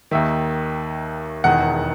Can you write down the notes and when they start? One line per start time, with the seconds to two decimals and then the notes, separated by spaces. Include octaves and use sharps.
0.11 D#2 D#3 E5
1.44 E1 E2 D#3 F#5